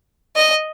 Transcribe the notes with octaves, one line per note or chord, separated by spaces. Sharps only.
D#5